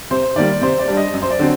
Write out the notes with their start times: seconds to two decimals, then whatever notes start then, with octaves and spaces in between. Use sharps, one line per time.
0.11 C3 C5
0.36 D#3 G3 A#3 D5
0.61 C3 C5
0.79 D5
0.88 G3 D4
0.97 D#5
1.13 F#2
1.22 C5
1.30 D5
1.39 D3 F#3 C4